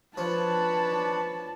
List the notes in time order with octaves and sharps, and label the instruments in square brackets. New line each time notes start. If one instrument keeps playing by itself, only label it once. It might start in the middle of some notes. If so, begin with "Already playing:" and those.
[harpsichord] F3 [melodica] D4 C#5 [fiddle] B4 [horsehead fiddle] A5